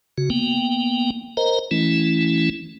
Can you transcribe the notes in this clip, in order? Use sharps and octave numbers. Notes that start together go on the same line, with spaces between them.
C#3 F#4
A#3 B3 G5
A#4 C5 D#5 A#5
E3 A3 C#4 E4